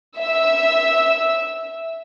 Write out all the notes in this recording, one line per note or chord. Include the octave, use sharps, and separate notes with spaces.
E5 E6